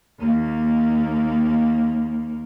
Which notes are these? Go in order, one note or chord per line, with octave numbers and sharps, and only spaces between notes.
D#2 A#3